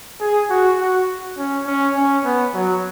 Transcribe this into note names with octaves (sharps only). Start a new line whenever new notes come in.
G#4
F#4
F#4
C#4
C#4
C#4
B3
F#3